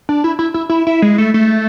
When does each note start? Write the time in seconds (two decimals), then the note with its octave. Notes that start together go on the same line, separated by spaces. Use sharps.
0.09 D4
0.24 E4
0.39 E4
0.54 E4
0.69 E4
0.87 E4
1.02 G#3
1.18 A3
1.34 A3